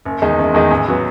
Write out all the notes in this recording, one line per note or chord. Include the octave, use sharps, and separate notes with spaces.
F#1
E2 D#3 G#3 D#4
F#1
E2 D#3 G#3 D#4
A1
F#3 B3